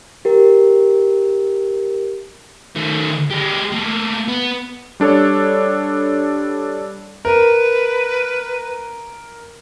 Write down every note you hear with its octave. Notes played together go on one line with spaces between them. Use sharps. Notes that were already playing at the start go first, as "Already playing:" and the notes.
G4 A#4
D#3 A3
G#3 G4
A3 A#3
B3
G3 D4 A4 C#5
A#4 B4